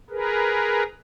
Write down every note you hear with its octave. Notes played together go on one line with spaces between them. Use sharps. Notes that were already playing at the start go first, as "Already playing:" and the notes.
G#4 A#4 B4